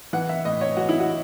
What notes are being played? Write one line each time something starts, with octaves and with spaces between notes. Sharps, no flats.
E3 F#5
E5
A2 D#5
C#5
E3 F#4
E4
F#4